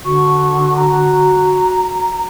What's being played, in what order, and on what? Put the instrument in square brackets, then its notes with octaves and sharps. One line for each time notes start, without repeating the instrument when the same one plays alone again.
[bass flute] D3 [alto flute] F#4 [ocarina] C#6
[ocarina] A#5